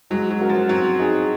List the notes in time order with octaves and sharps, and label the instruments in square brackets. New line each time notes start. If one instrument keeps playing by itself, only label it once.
[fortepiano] F#3 [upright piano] G#3
[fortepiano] F#3
[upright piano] C#4 F#4 A#4
[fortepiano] F3
[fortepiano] F#3 [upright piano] C4
[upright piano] D#4 G#4